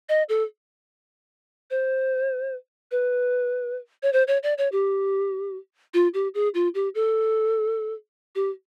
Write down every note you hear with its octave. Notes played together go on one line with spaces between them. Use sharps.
D#5
A4
C5
B4
C#5
C5
C#5
D5
C#5
G4
F4
G4
G#4
F4
G4
A4
G4